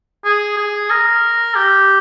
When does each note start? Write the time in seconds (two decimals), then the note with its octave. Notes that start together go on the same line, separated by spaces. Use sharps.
0.25 G#4
0.57 G#4
0.91 A#4
1.55 G4